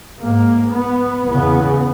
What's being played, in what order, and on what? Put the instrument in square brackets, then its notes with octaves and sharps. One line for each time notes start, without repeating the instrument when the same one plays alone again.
[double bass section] G#2 A#3
B3
E2 C#3 B3